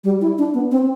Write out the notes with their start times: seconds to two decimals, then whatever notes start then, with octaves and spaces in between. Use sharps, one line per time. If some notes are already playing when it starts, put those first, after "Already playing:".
0.04 G3
0.21 E4
0.38 D4
0.54 B3
0.71 C4